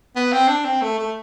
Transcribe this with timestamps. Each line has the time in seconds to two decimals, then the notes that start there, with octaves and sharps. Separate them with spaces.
0.16 B3
0.32 C4
0.48 D4
0.65 C4
0.82 A3
0.99 A3